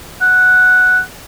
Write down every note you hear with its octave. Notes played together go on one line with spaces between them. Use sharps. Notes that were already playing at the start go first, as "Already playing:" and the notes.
F#5